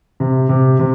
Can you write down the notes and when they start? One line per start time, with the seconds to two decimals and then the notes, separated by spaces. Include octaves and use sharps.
0.20 C3
0.49 C3
0.79 C3